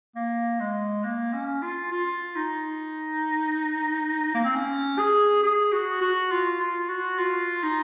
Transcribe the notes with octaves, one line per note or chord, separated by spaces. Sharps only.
A#3
G#3
A#3
C#4
F4
F4
D#4
A#3
C4
C#4
G#4
G#4
F#4
F#4
F4
F4
F#4
F4
D#4